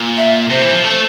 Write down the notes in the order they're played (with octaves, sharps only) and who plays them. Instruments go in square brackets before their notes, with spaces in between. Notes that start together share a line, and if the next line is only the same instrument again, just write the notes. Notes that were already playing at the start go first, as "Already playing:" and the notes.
Already playing: [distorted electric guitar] A#2
[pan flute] E5
[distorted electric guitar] C3 [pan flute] C5
[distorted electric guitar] E3
F3
A3